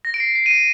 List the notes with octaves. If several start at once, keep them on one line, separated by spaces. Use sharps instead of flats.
A#6
D7
C7
C7
D#7
D7